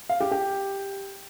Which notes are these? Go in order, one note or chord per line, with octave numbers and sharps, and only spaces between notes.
F5
G4
G4